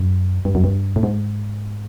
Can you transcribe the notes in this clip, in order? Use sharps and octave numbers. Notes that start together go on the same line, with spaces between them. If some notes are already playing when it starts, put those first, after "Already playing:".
Already playing: F#2
G2
F#2
G2
A2
G#2